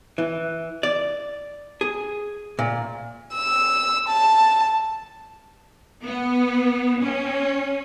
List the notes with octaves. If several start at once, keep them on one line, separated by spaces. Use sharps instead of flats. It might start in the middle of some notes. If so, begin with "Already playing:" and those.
E3
D5
G#4
A#2
E6
A5
B3
C#4